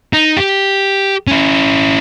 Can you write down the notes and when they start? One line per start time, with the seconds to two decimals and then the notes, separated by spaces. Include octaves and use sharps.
0.13 D#4
0.36 G4
1.27 C#4 E4